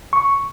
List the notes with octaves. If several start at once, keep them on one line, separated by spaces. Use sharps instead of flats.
C#6